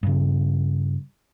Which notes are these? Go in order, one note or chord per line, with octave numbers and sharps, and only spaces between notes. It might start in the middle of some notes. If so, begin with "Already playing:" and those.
G2 C#3